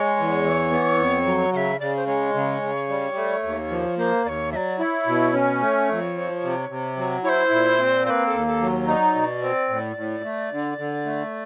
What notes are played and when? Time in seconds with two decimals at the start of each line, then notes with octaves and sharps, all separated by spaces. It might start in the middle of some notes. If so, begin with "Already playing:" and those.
Already playing: G#3 C#5
0.17 E2
0.44 E3
0.71 B3
0.98 F2
1.25 F#3
1.53 C#3 F#5
1.57 E5
1.80 C#3 D5
1.97 C5
2.06 G#3 C#5
2.34 C#3
2.62 C#3
2.89 G3
3.16 A3
3.43 D#2
3.70 F3
3.98 A#3 C5
4.25 D#2 D5
4.29 C#5
4.52 F#3 E5
4.56 D5
4.79 E4 D5
4.83 C#5
5.07 B2
5.33 C#4
5.61 A3
5.89 F2
6.15 F3
6.43 C3
6.69 C3
6.97 F#3
7.24 E4 C#5
7.29 C5
7.51 A#2
7.79 C4
8.06 A#3 C5
8.10 B4
8.27 A4
8.33 D#2
8.47 A4
8.61 F#3
8.87 D#4 D5
9.15 B2
9.42 C4
9.69 A2
9.96 A2
10.24 A3
10.51 D3
10.78 D3
11.05 A3